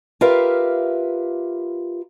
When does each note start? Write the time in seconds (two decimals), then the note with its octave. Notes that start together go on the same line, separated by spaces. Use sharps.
0.21 F4 G4 A#4 B4 E5 F5